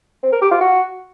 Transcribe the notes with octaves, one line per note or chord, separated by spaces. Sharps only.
C4
A#4
G4
F4
F#4